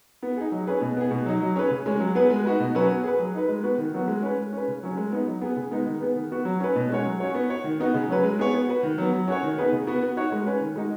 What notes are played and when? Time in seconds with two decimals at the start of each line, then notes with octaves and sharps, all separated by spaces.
0.23 B3
0.37 D#4 G#4
0.52 F#3
0.67 C#4 G#4 B4
0.81 B2
0.97 B3 G#4
1.11 B2
1.26 F#3 D#4
1.40 F#3
1.56 C#4 G#4 B4
1.70 C#3
1.86 G#3 C#4
2.00 F#3
2.15 B3 G#4 B4
2.30 G#3
2.44 D#4 F#4 B4
2.60 B2
2.75 F#3 C#4 F#4 B4
2.89 B3
3.04 G#4 B4
3.19 F#3
3.34 D#4 B4
3.49 G#3
3.63 B3 F#4 B4
3.78 D#3
3.94 F#3 B3 F#4
4.08 G#3
4.23 C#4 B4
4.38 G#3
4.53 C#4 B4
4.68 C#3
4.83 F#3 C#4
4.97 G#3
5.12 B3 D#4
5.27 F#3
5.41 B3 G#4 B4
5.56 C#3
5.71 G#3 B3 D#4
5.86 D#3
6.01 B3 G#4 B4
6.16 D#3
6.31 B3 F#4
6.45 F#3
6.60 C#4 B4
6.76 B2
6.90 G#3 C#4 F#4 C#5
7.05 F#3
7.20 C#4 F#4 C#5
7.34 B3
7.50 F#4 C#5
7.64 D#3
7.80 B3 D#4 F#4
7.94 C#3
8.09 F#3 C#4 B4
8.24 G#3
8.39 B3 G#4 C#5
8.53 B3
8.69 F#4 B4
8.83 D#3
8.98 F#3 B3
9.13 F#3
9.28 C#4 F#4 C#5
9.43 D#3
9.58 B3 D#4 G#4 B4
9.72 C#3
9.87 B3 F#4 B4
10.03 B3
10.17 D#4 F#4 C#5
10.32 G#3
10.47 C#4 B4
10.61 D#3
10.76 G#3 D#4 F#4